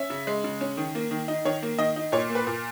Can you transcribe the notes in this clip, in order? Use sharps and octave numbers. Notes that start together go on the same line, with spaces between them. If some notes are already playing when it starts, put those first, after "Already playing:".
Already playing: C#4 E5
C#3
G#3
C#3
C#4
D#3
A#3
D#3
D#4
D#3 C#5
A#3
D#3 D#5
D#4
A#2 C#5
A#3
B4
A#2